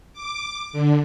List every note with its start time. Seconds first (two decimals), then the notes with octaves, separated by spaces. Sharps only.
0.13 D6
0.73 D3